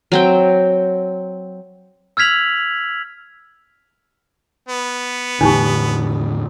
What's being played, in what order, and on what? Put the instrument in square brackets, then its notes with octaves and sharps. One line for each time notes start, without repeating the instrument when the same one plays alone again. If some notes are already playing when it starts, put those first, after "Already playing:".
[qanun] F#3 C4 G5
[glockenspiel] E6 F6 G#6 B6 F7 F#7
[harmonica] B3
[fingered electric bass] E2 A2 D3 [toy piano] D4 D#4 G4